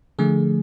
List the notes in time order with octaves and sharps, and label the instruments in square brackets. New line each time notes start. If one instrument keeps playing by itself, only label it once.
[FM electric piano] D3 F3 A3 G#4